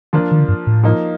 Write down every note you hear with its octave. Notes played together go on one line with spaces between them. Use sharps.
D#3 F3 A#3 D4 F4
D#3
D3
G2
A2
F3 A#3 D#4